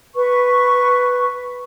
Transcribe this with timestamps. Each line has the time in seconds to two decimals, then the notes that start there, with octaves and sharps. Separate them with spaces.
0.16 B4 C#6